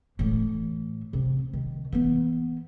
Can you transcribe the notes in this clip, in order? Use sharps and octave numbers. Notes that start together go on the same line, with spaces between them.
A2 E3
C3
D#3
E3 B3